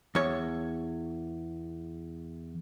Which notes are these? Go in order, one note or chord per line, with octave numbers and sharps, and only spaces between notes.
E2 C#5